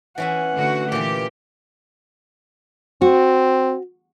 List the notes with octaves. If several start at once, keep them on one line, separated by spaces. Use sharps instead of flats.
E3 C#4 E5 F#5
D3 A3 F#4
A#2 E3 G4
C4 F#4